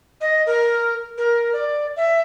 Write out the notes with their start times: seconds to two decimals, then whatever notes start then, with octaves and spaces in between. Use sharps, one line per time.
0.21 D#5
0.46 A#4
1.18 A#4
1.53 D5
1.96 E5